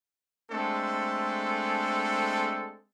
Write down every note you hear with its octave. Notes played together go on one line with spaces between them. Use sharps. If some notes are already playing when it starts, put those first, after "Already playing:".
G#3 A3 C4 D4 A4